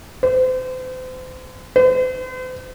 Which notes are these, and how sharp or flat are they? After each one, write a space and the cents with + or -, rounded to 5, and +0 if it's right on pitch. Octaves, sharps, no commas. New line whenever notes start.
C5 -35
C5 -45